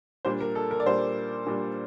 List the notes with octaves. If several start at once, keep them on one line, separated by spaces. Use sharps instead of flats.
A#2 G3 D4 C5
A#4
A4
A#4
D5
A#2 G3 D4 C5
A#2 G3 D4